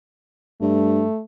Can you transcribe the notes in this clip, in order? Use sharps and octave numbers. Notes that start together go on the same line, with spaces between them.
G2 A3